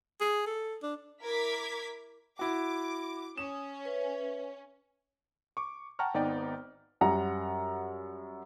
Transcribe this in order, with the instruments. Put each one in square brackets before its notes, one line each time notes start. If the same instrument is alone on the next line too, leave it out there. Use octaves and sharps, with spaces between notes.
[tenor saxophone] G#4
A4
D4
[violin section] E4 A#4 D6 G#6 B6
[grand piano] E4 F#4 [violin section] D6
[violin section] C#4 [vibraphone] D#6 [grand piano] E7
[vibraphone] B4 E5
[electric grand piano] C#6 D6
F#5 G5 A5 A#5 C#6 F6
G#1 B3 D#4 B4 D5 G5
[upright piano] F#2 G3 F#5 A#5